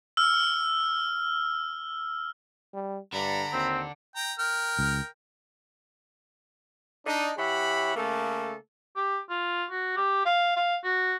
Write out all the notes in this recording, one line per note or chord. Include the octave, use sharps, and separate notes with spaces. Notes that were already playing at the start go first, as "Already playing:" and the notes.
E6 F6
G3
G2 D3 D4 A#5 B5
D#2 C4
G5 A#5
A#4 G5 F6
C#2
D4 D#4
E3 G4 C#5 E5 F#5 B5
C#3 A3 A#3 A4
G4
F4
F#4
G4
F5
F5
F#4